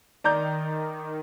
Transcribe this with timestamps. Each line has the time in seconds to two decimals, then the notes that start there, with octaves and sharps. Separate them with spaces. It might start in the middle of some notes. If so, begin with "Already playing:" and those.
0.24 D#3 D5 A#5 G6